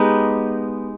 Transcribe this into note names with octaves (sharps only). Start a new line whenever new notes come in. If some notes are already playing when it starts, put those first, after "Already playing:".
Already playing: G#3 B3 D#4 G4